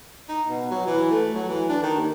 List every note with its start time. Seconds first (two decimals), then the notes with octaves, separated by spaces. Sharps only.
0.29 D#4
0.47 B2
0.71 F#3
0.86 E3
1.11 A3
1.35 F#3
1.49 E3
1.69 D4
1.83 D#3
1.96 D#2